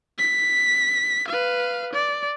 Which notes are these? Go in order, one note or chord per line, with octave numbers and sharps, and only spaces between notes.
B6
B4 F5
D5